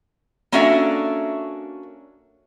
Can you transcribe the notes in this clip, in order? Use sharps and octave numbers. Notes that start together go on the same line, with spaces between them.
A#3 C#4 D4 F#4 A4 E5